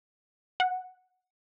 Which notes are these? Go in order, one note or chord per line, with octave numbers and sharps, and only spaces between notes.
F#5